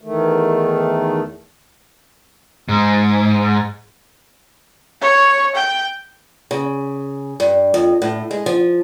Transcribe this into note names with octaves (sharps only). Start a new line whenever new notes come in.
E2 D#3 A3
G#2
C#5
G5
C#3
G2
F2
A2
G#3
F3